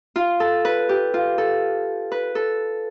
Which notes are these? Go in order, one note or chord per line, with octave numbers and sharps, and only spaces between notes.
F4
A4
B4
G4
F4
A4
B4
A4